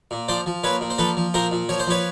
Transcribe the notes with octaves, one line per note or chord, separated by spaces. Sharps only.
A#2
F3 C5 D5
F3
A#2 B4 C#5
A#2
C5
F3 A4 B4
F3
A#2 A#4 C5
A#2
F3 C#5
C5
F3 B4 C#5